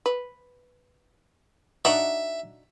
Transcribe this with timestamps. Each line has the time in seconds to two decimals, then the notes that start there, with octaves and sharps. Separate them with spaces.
0.06 B4
1.85 D4 D#4 F#4 E5